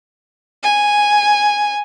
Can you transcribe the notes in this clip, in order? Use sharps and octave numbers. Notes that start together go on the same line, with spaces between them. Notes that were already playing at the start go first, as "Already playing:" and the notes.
G#5